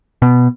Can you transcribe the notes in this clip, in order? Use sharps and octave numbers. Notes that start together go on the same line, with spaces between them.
B2